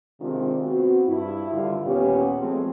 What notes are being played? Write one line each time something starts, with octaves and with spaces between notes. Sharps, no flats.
C3 D#3 G#3 C4 D4 F4
B3 C4 F4 F#4
G2 E4
G2 D3 D#3 G3 F4
D#2 A#2 B3 C#4 G4
F3 G#3 A3 B3 C4